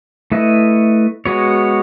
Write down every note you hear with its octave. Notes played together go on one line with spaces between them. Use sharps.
A3 E4 B4 D#5
G#3 B3 F#4 C#5